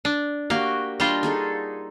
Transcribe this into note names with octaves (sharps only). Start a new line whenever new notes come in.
D4
A#3 F#4 G4
G3 D4 F4 D#5 C6
D#4 G#4 A4